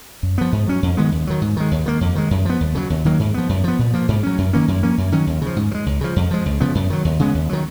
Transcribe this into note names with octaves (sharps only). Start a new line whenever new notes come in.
F#2
F3 B3
G#2
F#3 C#4
F2
D#3 G#3 B3
D#2
D#3 F#3
G#2
D#3 G#3
D#2
D#3 A#3
F2
D#3 G#3
F#2
F3 B3
D#2
C#3 F#3
D#2
D#3 F#3 A#3
G#2
F3 B3
F#2
F3 B3
A#2
F3 A#3
G#2
F#3 C#4
F#2
D#3 A#3 C#4
F#2
F3 A#3 C#4
F#2
D#3 F#3 C#4
D#2
C#3 F3
G#2
F3
G#3
C#2
C#3 F3
F2
F3 G#3
C#2
C#3 F3 B3
F#2
D#3 F#3
D#2
C#3 G#3 B3
D#2
D#3 F#3